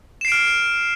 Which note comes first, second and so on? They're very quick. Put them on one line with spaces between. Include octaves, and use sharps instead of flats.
E7 C7 D7 F6